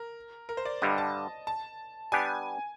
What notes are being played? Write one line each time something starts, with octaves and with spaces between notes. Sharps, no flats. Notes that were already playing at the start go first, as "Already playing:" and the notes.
Already playing: A#4
A#4
C5
D5
G2 D3 G3 D#5
A5
A5
G3 B3 D4 G4 G#5